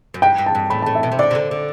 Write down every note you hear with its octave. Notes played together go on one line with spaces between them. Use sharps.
F#2
G2 G5
G2
A5
G2
A2 B5
A5
A2
E5
B2
C3
D3 D5
C3
D3
D3